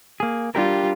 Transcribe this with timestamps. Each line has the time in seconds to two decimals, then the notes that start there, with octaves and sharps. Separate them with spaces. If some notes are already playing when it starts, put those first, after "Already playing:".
0.20 A#3 G#4
0.55 G3 D4 F4 G4 A#4